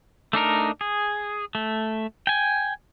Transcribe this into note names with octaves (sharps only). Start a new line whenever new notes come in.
A3 D4 D#4 A#4
G#4
A3
G5 G#5